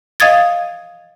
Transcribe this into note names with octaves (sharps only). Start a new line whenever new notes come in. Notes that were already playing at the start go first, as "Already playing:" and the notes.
D#5 F5 D#6 G#6 A6